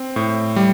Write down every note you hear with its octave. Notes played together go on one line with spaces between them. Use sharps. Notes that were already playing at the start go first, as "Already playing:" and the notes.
Already playing: C4
A2
G3